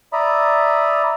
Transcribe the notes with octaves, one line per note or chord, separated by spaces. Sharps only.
D5 E5 A#5 B5 D#6